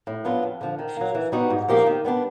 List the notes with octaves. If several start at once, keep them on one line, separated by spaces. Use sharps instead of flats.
A2
F#3 B3 D4 F4
F2
D3 F3
D#3
F#3 A#3
E3
G3 B3 D#4 F#4
G#2
F3 A#3 D#4 G4
D#3
G3 B3 D4